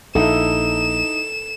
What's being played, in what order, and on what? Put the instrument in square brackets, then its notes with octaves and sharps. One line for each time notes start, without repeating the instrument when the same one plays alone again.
[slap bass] A#1 A#2 [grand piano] D#4 E4 [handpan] A4 [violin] E7